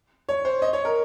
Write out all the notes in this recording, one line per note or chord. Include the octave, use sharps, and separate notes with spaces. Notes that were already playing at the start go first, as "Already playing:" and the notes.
C#5
C5
D#5
C#5
A#4